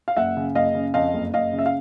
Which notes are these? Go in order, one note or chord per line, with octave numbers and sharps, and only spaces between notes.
F5
F#1 E5 F#5
C#3
F#1 D#5 F5
C#3
F2 D#5 F5
F#1
F#1 D#5 F5
C#3
E5
F5